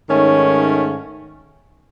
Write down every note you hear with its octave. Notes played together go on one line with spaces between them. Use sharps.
G#2 D#3 A3 C#4